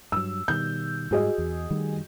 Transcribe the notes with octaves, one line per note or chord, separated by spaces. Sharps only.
G2 F#3 E6
B2 D#3 G3 G6
G#2 G3 F#4 G#4 D#5
E2
D#3 G3 A3